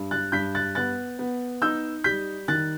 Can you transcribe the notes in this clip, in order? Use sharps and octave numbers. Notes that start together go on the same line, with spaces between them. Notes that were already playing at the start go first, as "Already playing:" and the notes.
Already playing: G2
F#6 A6
G2 G6 B6
F#6 A6
B3 F#6 A6
B3
D#4 E6 G6
G3 G6 B6
D#3 F#6 A6